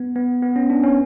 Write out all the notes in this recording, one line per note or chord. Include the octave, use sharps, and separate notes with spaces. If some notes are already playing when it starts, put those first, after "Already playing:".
Already playing: B3
B3
B3
C#4
D4
C#4